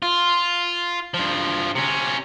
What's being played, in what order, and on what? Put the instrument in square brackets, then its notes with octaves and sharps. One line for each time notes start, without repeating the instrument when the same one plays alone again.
[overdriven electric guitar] F4
G2 F3
C3 C#4